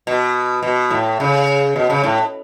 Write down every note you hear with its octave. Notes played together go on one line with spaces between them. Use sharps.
B2
B2
A2
C#3
B2
C#3
A2